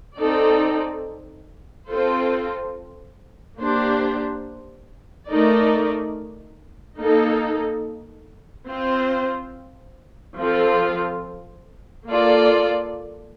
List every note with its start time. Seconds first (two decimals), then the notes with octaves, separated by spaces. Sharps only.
0.19 C4 D#4 A4 D5
1.88 C4 F4 A4 C5
3.58 A#3 D4 G4 C5
5.28 A3 D#4 A#4 D5
6.98 A#3 D#4 A4
8.68 C4 F4 C5
10.37 F3 C4 F4 A4
12.07 A#3 F4 A4 D5